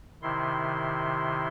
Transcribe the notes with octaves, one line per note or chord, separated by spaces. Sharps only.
C3 D#3 E4 C6